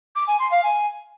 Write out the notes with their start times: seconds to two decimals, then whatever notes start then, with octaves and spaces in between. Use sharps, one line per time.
0.16 D6
0.28 G#5
0.39 C6
0.51 F5
0.63 G#5